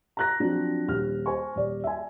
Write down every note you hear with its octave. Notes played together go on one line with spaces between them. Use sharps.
A#5 F#6 A#6
F3 F#3 C4 D4 F#4
D#1 F6
C5 G#5 C#6
D#1 D5
E5 G#5